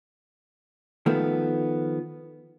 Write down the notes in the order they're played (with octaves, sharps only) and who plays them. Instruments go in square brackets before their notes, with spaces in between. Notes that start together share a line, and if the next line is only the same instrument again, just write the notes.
[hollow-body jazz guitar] D#3 F3 A3 B3